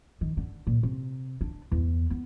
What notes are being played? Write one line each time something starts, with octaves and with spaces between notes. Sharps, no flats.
D#3
D3
A#2
C3
D4
E2
B3